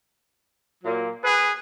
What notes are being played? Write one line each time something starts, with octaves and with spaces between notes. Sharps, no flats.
A#2 F#3 A#3
G#4 B4